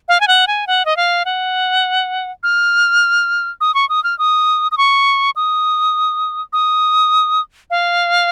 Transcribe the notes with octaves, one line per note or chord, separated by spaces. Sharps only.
F5
G#5
F#5
G#5
F#5
D#5
F5
F#5
F6
D#6
C#6
D#6
F6
D#6
D#6
C#6
D#6
D#6
F5